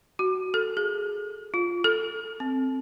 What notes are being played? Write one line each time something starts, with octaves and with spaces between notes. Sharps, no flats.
F#4
A4
G#4
F4
A4
C4